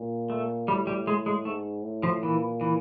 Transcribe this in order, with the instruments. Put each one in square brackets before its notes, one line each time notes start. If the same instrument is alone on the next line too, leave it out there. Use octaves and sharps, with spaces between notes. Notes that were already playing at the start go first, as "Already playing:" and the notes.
Already playing: [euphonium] A#2
[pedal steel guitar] A3
[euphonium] A2 [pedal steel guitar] G3
[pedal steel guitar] G3
G#3
G#3
[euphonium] G#2 [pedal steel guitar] A3
[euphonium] A2
[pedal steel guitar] F3
[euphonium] A#2 [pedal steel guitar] E3
[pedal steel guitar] E3